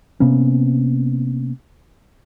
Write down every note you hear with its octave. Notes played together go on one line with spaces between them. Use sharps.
C3 A#3 B3 C#4